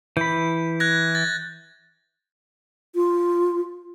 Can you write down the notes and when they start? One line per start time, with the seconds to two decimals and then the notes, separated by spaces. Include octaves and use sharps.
0.17 E3 B5 G6
0.80 F#6 G#6 A#6
1.15 A6
2.95 F4